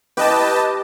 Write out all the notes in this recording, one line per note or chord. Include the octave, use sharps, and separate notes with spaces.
G4 B4 D#5 A5